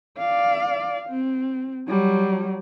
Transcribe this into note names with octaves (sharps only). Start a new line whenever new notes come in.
D5 F5
C4
F#3 G3